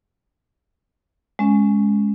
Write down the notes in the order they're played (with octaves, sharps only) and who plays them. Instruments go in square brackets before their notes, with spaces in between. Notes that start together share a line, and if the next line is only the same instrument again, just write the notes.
[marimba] G#3 C#4